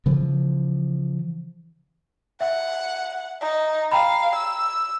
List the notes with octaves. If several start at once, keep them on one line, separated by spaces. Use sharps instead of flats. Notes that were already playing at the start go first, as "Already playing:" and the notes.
C#3 E3 F3
E5 F#5
D#4
F5 G5 A#5 B5
E6